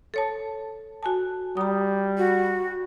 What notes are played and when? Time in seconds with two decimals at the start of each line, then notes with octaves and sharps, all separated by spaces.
0.14 A4 C#5 A5
1.03 F#4 G#5 A5
1.57 G3 A#5 D#6
2.18 F#4